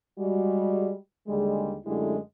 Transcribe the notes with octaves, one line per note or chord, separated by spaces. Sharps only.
G3 G#3 F#4
D#2 D3 G3 G#3
F#2 D3 G#3 A3 E4 G4